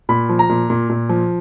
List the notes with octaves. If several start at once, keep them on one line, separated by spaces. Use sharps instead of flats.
A#2 B5
F3
A#5
A#2
A#2
A#2
F3